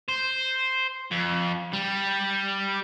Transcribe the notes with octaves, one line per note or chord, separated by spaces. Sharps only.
C5
F2
G3